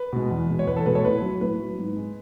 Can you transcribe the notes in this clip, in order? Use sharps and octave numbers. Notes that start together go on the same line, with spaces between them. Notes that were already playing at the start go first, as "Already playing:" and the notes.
Already playing: B4
B2 G#3
E2
B2 G#3
C#5
E2 B4
A4
B2 G#3 B4
A4 C#5
A2 B4
F#3
A2 B4
F#3
G#2
G#3